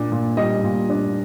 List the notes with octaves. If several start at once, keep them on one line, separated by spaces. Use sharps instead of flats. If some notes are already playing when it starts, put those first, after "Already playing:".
Already playing: A#2 D4
A#2
G3 D#5
A#2
D4